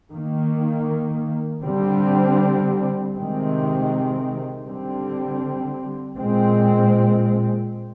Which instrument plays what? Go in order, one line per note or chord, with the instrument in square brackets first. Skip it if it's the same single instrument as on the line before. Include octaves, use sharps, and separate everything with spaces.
[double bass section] D#3 A#3
D3 G3 C4
C3 D#3 G#3 C4
D3 G3 C4
A#2 G#3 C4